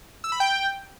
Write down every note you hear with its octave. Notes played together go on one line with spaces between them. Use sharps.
E6
B5
G5